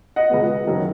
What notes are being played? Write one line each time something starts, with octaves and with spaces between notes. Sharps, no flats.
D#5 F#5
C#2 B2 G#3 B3
F#1 F#2 D#3 F#3